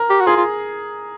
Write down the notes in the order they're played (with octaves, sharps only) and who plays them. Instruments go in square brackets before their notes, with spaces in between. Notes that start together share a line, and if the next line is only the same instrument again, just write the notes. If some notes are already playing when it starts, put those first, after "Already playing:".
Already playing: [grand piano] A#4
[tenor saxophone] G4
F#4
[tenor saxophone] F4 [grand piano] G#4
[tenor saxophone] F4